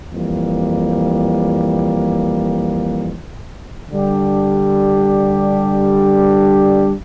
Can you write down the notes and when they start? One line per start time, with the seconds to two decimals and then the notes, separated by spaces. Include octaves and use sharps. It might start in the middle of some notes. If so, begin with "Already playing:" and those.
0.13 F2 E3 G3 A#3
3.91 D3 G3 D4 G4